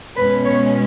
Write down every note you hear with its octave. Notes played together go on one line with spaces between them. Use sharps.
B2 G#3 C#4 B4
C#5